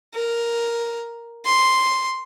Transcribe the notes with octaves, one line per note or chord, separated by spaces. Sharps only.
A#4
C6